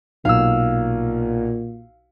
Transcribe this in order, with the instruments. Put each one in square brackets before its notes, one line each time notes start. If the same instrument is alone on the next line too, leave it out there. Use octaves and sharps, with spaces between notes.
[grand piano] B1 [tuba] A#2 [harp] F5 E6